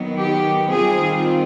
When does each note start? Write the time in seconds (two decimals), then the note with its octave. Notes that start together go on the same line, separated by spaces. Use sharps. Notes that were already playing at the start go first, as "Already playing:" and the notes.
Already playing: D#3 F#3 B3
0.18 G4
0.69 D#3 G3 C4 F4 G#4